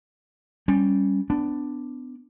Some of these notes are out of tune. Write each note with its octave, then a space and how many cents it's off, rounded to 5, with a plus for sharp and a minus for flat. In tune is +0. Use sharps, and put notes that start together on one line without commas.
G3 +0 C#4 +0
B3 +30 D4 +0